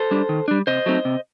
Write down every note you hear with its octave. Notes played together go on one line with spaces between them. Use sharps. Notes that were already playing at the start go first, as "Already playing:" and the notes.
Already playing: A4 C5
G3 D4
D#3
G3 D4
C3 C5 D#5
F#3 A3 C4 D#4
C3